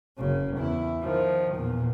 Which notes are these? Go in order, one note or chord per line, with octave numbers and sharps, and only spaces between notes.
F#1 C#3
E2 E4
D#3 F3
E2 A#2